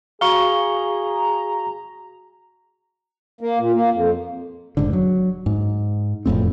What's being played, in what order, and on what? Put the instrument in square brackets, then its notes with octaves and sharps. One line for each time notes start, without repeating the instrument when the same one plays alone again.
[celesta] F#4 G7 [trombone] G#4 [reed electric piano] F5 C#6 [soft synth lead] A#5
[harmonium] A#3
A#2
A#3
F2
[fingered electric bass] F1 G#2 D3
F#3
G#2
E1 F2 A2 C4